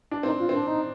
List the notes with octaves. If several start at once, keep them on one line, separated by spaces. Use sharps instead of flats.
D4
C4 D#4
F4
C4 D4
D#4